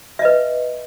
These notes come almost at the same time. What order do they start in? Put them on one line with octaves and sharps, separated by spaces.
E5 D#5 B4